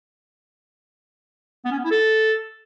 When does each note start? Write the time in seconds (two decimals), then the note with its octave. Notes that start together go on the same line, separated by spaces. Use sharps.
1.65 B3
1.72 C#4
1.78 B3
1.85 E4
1.91 A4